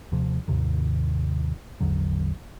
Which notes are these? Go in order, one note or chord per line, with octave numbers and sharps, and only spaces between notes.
D#2 C3 F3
D#2 G#2 C3 D#3
A1 E2 D3 F#3